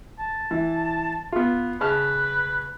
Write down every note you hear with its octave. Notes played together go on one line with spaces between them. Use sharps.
A5
E3
B3 F4
C#3 B4 A5 F6